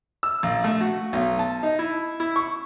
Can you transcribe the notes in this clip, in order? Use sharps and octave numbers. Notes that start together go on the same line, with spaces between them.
E6
A#1
A3
F#4
B1
A5
D#4
E4
E4
C#6